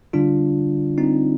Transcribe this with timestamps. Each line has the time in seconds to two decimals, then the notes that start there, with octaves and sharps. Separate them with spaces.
0.13 D3 G3 D4 F4
0.98 C4 D#4